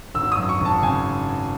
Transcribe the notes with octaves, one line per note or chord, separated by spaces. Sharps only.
G#1 E6
D#6
F#2
C#6
G#1 A5
C#3 G#5